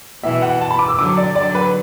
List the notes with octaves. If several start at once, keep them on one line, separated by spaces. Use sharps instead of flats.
B2 E3 E5
F#5
A5
B5
D6
E6
D3 F#3 D6
D5
D3 F#3 D5
B4